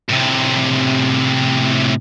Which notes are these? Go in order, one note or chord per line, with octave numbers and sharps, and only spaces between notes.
A2 C3